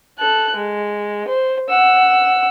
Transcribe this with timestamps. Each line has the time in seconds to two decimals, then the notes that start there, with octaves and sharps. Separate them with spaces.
0.18 A4 F#6
0.55 G#3
1.28 C5
1.69 F#5 E6